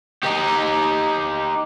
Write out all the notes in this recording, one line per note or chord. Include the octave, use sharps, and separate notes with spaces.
D#4 G4